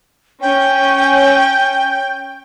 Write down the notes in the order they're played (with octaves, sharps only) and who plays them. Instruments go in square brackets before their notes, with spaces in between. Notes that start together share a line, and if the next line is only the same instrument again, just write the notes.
[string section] C#4 [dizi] G5